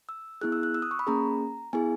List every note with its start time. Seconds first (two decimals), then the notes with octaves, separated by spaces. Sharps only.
0.09 E6
0.41 B3 E4 G#4 F#6
0.52 E6
0.63 F#6
0.74 E6
0.82 D#6
0.91 C#6
0.99 B5
1.07 A#3 C#4 G#4 A#5
1.73 B3 E4 G#4 G#5